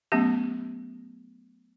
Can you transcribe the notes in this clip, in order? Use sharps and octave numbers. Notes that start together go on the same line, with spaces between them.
F#3 A3 B3 C#4 G4